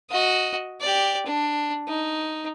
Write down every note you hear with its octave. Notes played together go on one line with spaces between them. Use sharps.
F#4 D#5
G4 D5
D4
D#4